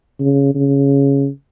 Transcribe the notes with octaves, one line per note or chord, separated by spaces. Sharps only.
C#3
C#3